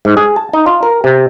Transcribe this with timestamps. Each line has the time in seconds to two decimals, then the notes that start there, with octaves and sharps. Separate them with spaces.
0.05 G#2
0.17 G#4
0.36 A5
0.53 D#4
0.66 F4
0.83 A#4
1.04 C3